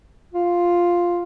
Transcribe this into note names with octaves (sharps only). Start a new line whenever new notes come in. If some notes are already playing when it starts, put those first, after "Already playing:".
F4